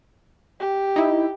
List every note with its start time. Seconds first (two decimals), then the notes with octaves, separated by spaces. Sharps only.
0.60 G4
0.96 D#4 E4